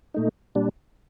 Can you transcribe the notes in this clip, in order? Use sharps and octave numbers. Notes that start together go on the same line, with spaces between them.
A#2 A3 D#4
A#2 G3 D4